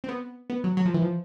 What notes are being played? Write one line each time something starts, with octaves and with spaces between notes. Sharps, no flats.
C4
B3
B3
F#3
F#3
F3
E3
F3